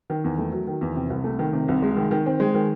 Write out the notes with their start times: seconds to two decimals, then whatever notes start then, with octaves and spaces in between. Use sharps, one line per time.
0.10 D#3
0.24 E2
0.38 A3
0.52 F#3
0.67 D#3
0.81 E2
0.96 C3
1.10 C2
1.24 A3
1.39 D#3
1.53 C3
1.68 C2
1.82 G#3
1.97 D#3
2.11 D#3
2.26 C4
2.40 G#3
2.55 D#3